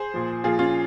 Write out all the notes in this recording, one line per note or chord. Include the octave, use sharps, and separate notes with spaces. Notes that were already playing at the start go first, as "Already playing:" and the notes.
Already playing: G#4 C5
A#2 F3
A#2 F3 F4 G#4
C#4 F4